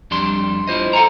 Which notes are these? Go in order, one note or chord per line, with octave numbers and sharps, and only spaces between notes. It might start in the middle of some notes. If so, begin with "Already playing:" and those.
F2 G3 D4 C6
E4 F4 C5 D#5
A4 F#5 G#5 A#5